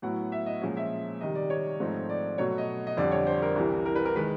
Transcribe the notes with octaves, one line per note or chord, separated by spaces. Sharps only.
A2 F#3 B3 E4 F#5
E5
D#5
A#2 F3 G#3 C#4
E5
C3 D#3 G3 D#5
D5
C#5
G#2 F3 A3 C4 D#4
D5
B2 F#3 A3 C#5
D#5
D#5
F2 D3 G3 D5
C#5
C5
A#4
C2 C3 E3
A#4
B4
A#4
D#3 G#3 B4